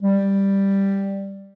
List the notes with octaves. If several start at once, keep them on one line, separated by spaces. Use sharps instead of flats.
G3